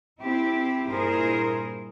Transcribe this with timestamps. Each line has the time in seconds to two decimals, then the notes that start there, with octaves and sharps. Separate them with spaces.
0.19 C4 E4 G4
0.88 G2 A#2 E4 G#4 A#4 C5